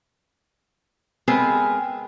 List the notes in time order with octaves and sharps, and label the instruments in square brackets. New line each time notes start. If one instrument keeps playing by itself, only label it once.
[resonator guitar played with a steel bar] G#3 B3 C4 G#4 A#4 B4